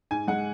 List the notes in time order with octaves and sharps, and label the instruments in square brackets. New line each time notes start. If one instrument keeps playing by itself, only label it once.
[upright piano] G#2 G#5
G#3 F#5